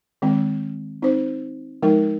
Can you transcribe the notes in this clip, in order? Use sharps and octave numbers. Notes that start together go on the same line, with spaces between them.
D#3 G#3 C4
C4 D#4 C5
F3 G#3 D#4 A#4